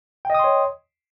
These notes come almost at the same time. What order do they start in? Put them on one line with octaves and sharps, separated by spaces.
G5 D#5 D#6 C6 C#5